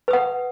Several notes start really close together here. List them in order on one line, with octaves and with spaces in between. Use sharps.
B4 D#6 F#5